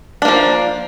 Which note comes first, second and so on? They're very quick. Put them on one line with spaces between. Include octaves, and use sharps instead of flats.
D4 A#3 F3